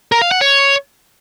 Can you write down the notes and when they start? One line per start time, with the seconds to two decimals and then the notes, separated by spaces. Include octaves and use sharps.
0.12 A#4
0.22 F5
0.31 F#5
0.41 C#5